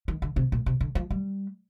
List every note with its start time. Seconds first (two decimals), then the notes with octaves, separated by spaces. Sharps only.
0.08 D#3
0.22 D3
0.36 C3
0.52 A#2
0.66 C3
0.81 D3
0.95 F3
1.10 G3